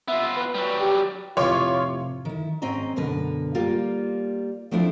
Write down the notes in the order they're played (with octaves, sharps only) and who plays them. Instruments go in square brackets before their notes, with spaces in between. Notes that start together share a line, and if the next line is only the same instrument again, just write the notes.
[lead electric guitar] B3 F4 [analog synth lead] E5
[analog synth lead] B4
[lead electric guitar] F#3 G3
[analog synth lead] G4
[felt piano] F1 A2 C3 [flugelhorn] F4 [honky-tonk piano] C#5 C6 D6
[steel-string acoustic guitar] D#3 E4
G#2 C4 C#4 D#5 A#5
F#2 B2 D3 A#4 B4
G3 A#3 F4
F3 A3 C4 D4 E4 F4